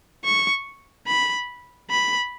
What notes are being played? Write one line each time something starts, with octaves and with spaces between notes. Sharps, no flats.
C#6
B5
B5